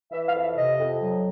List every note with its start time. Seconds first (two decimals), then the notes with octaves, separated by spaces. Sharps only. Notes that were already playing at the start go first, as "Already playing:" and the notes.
0.12 E3 E5
0.27 F5
0.33 F2
0.42 E5
0.56 C3 D#5
0.79 F2
1.01 F#3